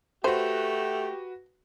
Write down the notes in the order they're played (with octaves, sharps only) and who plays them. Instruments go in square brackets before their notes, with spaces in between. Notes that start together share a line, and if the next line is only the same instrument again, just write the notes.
[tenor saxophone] A3 [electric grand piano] F#4 B4 [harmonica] G4 [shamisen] C5